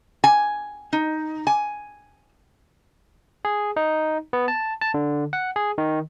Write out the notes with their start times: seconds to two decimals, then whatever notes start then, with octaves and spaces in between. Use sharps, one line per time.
0.24 G#5
0.93 D#4
1.47 G#5
3.45 G#4
3.76 D#4
4.33 B3
4.48 A5
4.81 A5
4.94 D3
5.33 F#5
5.56 G#4
5.78 D#3